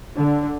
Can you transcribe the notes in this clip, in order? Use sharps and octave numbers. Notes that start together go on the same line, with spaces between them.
D3